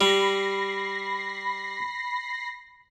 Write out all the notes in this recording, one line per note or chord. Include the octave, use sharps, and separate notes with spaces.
G3 B5 A#6 C7